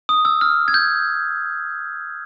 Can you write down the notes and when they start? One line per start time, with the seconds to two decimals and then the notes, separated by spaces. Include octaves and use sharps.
0.09 D#6
0.25 E6
0.41 F6
0.68 G#6
0.74 G6